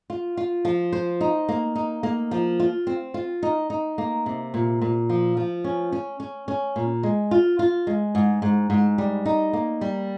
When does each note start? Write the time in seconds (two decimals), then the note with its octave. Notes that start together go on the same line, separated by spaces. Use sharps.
0.10 F4
0.37 F4
0.65 F3
0.93 C5
1.21 D#4
1.49 A#3
1.76 D#4
2.03 A#3
2.31 F3
2.60 F4
2.87 C4
3.14 F4
3.43 D#4
3.70 D#4
3.98 A#3
4.26 C3
4.54 A#2
4.82 A#2
5.09 F3
5.37 F3
5.64 C#4
5.92 C#4
6.20 C#4
6.48 C#4
6.76 A#2
7.03 G#3
7.31 F4
7.59 F4
7.87 G#3
8.15 G#2
8.42 G#2
8.70 G#2
8.98 G3
9.26 D#4
9.53 A#3
9.81 G3